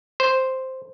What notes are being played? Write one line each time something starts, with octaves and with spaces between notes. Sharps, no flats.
C5